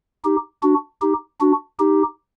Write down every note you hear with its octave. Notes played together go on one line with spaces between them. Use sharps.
D#4 G4
D4 F#4
D#4 G4
D4 F#4
D#4 G4